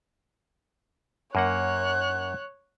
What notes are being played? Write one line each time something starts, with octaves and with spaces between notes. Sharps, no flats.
F#2 A#3 C#5 F#5 F#6